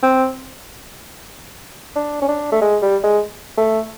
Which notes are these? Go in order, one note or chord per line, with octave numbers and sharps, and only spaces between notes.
C4
D4
C#4
D4
A3
G#3
G3
G#3
A3